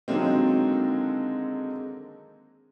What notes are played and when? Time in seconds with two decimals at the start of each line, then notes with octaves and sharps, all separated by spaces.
0.08 D3 D#3 F#3 G#3 A#3 C4